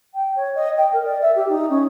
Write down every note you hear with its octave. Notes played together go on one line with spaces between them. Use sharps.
G5
C#5
D#5
G5
A#4
D5
E5
G4
D#4
C#4